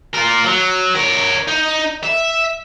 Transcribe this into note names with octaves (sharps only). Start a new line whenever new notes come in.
F4 A#4
F#3
A#4 C#5
D#4
E5